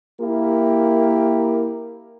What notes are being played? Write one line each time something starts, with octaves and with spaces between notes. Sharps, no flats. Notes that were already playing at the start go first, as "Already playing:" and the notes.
A#3 E4 G4 A#4